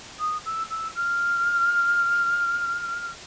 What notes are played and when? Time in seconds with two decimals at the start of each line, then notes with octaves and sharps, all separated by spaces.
0.20 D#6
0.46 E6
0.70 E6
0.96 F6